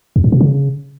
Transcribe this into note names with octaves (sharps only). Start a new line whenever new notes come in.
E2
G#2
B2
C#3